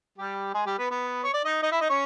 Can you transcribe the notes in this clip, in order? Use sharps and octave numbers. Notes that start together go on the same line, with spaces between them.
G3 G4
G#3 G#4
G3 G4
B3 B4
B3 B4
C#5
D5
D#4 D#5
D#4 D#5
E4 E5
D#4 D#5
C#4 C#5